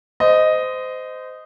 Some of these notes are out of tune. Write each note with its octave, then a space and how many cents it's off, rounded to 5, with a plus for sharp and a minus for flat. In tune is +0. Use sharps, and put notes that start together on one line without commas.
C5 -25 D#5 +0